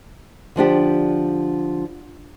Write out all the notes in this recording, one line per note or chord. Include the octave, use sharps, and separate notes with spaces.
D3 F3 D4 G4